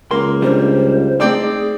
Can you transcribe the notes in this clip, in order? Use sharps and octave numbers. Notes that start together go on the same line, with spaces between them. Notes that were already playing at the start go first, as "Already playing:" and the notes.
C#2 A#3 C6
G3 C4 D4 C5
A3 C4 D#4 G#4 D5 G5